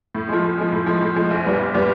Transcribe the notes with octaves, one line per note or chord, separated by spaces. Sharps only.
A2
F3 G#3
A2
F3 G#3
A2
F3 G#3
A2
F3 G#3
A#1
A#2 G3 B3
A#1
A#2 G3 B3